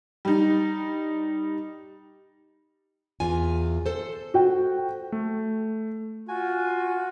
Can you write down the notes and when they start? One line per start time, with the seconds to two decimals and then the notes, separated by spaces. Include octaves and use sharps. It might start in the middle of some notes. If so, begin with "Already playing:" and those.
0.25 G3 D#4
3.20 E2 F4 G#5
3.86 A4 C5
4.34 F#4 G5
5.12 A3
6.28 F4 F#4 G#5